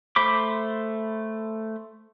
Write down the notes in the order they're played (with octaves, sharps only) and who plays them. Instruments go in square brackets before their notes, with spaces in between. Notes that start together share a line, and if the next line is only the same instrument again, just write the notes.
[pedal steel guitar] A3 C5 B5 D6